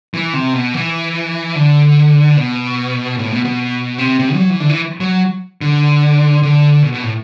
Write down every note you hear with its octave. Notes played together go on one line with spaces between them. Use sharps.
E3
C3
B2
E3
D3
B2
A2
B2
B2
C3
C3
G3
F#3
E3
D3
E3
F#3
D3
D3
B2
B2
A2